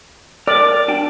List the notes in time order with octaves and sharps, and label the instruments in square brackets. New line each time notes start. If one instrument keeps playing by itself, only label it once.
[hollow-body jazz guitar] A#4 [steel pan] D5
[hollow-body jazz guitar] D4 F#4 G5